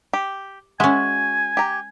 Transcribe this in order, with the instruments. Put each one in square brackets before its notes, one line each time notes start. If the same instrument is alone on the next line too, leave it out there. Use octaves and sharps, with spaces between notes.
[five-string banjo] G4
[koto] G#3 C#4 [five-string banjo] F#4 E5 [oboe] G#5
[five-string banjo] G4 A#5